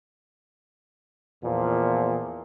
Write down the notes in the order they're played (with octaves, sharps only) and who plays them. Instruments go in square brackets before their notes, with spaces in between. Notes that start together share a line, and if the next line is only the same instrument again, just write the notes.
[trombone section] E2 A#2 F3